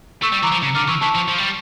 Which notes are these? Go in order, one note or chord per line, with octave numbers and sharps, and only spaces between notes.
A3 C#6 E6
G3
E3 A#5 D6
F3
C#3
D3 D6 F6
E3 C#6 E6
E3 A5 C#6
F3
F3
G3